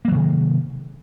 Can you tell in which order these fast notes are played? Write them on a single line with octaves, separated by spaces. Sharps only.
A#3 F#3 D#3 C3